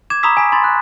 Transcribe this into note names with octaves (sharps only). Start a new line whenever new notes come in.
D6 G#6 E7
A#5 B5 C#6 D#6 E6 B6
G#5 B6
B5 C6 A6
F#6